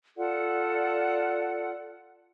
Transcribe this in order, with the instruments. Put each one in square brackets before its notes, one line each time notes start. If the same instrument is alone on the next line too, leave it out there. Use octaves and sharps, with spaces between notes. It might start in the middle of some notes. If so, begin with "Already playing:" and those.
[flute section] F4 A4 D5 F#5